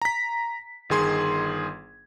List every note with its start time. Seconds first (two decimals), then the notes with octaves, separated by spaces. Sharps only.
0.02 A#5 B6
0.90 G1 D#3 G#4 C6 G#6